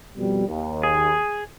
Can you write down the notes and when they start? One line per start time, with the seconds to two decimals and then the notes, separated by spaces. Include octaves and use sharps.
0.16 F2 B2 G3
0.48 D#2
0.83 G#4